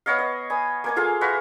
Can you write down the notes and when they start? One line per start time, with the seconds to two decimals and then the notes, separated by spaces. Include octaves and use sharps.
0.06 B3 C#5 D#5 F5
0.19 D#5
0.50 G#5 B5 D#6
0.84 A#3 G#5 D6
0.96 F4 G#4 A4 F5
1.21 F#4 B4 E5 F5